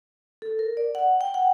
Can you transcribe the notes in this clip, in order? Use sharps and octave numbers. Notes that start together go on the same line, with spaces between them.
A4
A#4
D5
F#5
G5
F#5